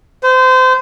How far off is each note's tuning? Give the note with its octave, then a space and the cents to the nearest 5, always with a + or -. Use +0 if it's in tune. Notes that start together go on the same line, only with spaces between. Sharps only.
C5 -30